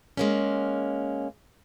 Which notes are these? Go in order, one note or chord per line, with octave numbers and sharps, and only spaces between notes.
G#3 A#3 C#4